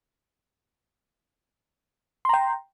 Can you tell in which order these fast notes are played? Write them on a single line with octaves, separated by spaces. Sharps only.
C6 A#5 G5